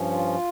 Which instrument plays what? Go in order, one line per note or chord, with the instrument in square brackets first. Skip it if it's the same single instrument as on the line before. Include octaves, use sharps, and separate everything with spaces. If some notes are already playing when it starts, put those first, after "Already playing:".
Already playing: [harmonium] G2 F3 C#4
F4